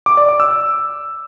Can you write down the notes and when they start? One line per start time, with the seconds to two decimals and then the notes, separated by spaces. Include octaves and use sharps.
0.06 D6
0.17 D5
0.29 D6
0.40 E6